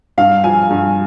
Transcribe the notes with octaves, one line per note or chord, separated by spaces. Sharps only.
G2 F5
F3 G#5
G2